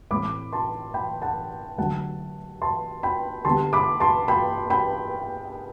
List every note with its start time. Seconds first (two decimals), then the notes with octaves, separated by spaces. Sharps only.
0.11 A2 E3 A3 C4 B5 D6
0.53 A5 C6
0.94 G5 B5
1.22 F#5 A5
1.78 D3 F#3 A3 F#5 A5
2.62 A5 C6
3.03 G5 B5
3.45 D3 G3 B3 A5 C6
3.73 B5 D6
4.00 A5 C6
4.28 G5 B5
4.70 G5 B5